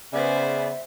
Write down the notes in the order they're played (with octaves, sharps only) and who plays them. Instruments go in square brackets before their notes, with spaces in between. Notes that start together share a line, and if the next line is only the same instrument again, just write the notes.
[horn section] C#3 B3 [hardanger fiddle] C5 G#5 [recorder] D5 [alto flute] E5